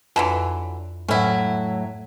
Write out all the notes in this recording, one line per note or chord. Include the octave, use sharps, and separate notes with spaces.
F2 D3 E3 F#3
A2 F#3 C#4 E4